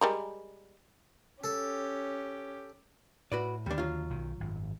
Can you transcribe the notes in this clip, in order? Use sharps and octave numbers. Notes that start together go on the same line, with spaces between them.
G3 G#3 A#4
C#4 G4 A4
A2 F#4 B4 D5
D#2 D3 G3 D4
F#3 F4
B1 D#3
G#1 F#2